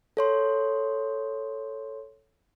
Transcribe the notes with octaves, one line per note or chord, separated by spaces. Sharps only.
A4 C#5 C6